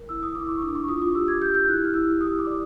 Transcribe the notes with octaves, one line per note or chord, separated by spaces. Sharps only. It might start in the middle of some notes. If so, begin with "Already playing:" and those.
Already playing: A#4
E4 E6
D#6
E4 D6
C#6
D4 D6
C#6
F4 D#6
D6
G4 E6
G#6
G4 G6
G6
E4 F#6
F6
E4 E6
G4 D#6
D6
D5